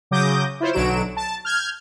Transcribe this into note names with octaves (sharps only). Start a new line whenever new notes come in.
C#3 F#3 D6 D#6 G6 A#6
E4 F4 C5 C#5
B1 D3 F#3 D7 E7
A5
F6 G6 G#6